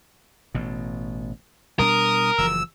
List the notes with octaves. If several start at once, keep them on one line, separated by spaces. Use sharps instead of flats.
A1 B2
B2 G3 D4 A#4 D#6
F#1 E3 F3 E6